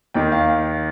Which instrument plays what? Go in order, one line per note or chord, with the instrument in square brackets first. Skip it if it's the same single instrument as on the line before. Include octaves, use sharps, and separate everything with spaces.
[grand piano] D#2 D#3 G5
F5